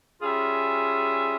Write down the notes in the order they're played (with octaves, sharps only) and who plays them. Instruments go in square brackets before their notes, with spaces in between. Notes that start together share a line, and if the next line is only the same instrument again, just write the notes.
[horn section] G3 C#4 F4 G#4 E5